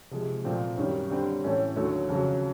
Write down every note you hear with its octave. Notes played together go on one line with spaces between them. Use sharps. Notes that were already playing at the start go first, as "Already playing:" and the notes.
C3 F3 G#3
A#2 F3 A3 C4
F#2 D#3 G3
D3 G3 C4
A2 E3 A3 C#4
D#2 D3 F#3 A3
F2 C#3 F#3